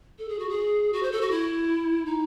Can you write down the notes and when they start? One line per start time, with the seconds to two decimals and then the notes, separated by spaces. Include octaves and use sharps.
0.19 A4
0.29 G#4
0.39 F#4
0.49 G#4
0.93 F#4
1.03 C5
1.12 A4
1.21 F#4
1.31 E4
2.06 D#4